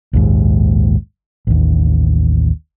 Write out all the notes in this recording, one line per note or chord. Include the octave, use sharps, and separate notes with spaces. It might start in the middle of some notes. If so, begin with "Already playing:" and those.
A#1 D#2 G#2
A1 D#2